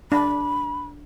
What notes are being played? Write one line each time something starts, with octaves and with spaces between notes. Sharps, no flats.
D4 B5